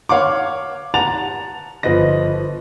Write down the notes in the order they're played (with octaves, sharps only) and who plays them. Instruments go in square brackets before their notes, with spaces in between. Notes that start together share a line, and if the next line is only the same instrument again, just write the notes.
[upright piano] C#5 F5 F#5 C#6 D6
F#5 A5 A#5 A6 F7
G1 F3 B4 D#5 A#6